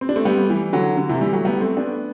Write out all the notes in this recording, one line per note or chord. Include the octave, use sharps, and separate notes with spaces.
C4
D4
A3 C4
G3 B3
E3 G3
D3 F#3
D3
C3 E3
E3 G3
F#3 A3
G3 B3
A3 C4
B3 D4